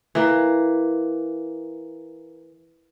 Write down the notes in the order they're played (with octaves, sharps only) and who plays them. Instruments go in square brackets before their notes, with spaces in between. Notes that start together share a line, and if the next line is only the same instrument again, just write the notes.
[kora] E3 A#3